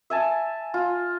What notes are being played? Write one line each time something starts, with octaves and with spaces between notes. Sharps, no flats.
E5 G#5 A5
F4